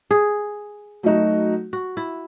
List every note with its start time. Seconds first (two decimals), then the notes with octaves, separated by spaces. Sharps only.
0.11 G#4
1.03 F#3 A3 D#4 F#4
1.73 F#4
1.97 E4